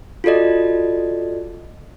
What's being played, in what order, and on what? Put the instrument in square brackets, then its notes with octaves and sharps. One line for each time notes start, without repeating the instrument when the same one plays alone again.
[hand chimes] F4 F#4 A4 D5 D#5